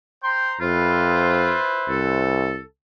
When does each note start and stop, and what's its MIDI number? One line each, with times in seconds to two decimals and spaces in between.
0.23 0.56 72
0.23 0.49 79
0.23 0.56 82
0.23 0.56 84
0.60 1.56 41
0.60 2.37 64
0.60 1.80 65
0.60 2.37 71
0.60 2.37 72
1.89 2.60 36
1.89 2.63 69